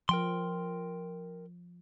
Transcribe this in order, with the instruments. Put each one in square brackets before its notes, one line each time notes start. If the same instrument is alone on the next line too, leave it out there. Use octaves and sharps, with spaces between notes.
[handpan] F3 [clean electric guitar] A#4 G5 C6